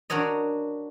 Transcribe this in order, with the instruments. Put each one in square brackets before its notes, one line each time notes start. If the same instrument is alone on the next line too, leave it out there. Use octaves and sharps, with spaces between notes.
[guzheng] D4 F#4 A#4 C#5 D#5